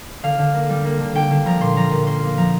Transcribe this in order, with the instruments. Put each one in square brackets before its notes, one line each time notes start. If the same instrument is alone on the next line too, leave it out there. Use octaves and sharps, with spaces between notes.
[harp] D3 F5
D3
A#3
G3
A#3
D3
D3 G5
D3
F3 A#5
A#2 C6
F3 A#5
A#2
A#3 C6
A#3
F3 A#5